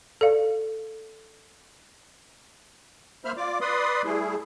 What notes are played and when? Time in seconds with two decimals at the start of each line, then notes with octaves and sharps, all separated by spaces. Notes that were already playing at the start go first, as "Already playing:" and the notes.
0.21 A4 D5 F5
3.25 A#3 C5 E5 B5 F6
3.37 F4 D5 D6
3.61 B4 D5 B5 C6 D#6
4.05 G3 A3 E4 G#4